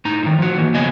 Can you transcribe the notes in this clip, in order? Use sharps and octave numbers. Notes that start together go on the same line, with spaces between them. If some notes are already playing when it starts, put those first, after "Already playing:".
A2 D#4 A#5
A2 D#3
F3 F#4
E3 A#3
C#3 F#3 B3 D#5 G#5